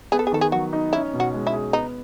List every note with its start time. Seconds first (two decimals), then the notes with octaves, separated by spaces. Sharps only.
0.12 B3 G#4
0.19 A4
0.27 G#4
0.32 D#3 A4
0.41 G#4
0.52 F#3 F#4
0.73 D#4
0.93 C#4 E4
1.13 B2
1.20 F#4
1.33 G#3
1.47 E4
1.53 G#4
1.73 B3 D#4